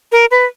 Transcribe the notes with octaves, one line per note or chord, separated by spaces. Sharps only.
A#4
B4